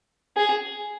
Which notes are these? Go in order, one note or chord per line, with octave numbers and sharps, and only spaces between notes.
G#4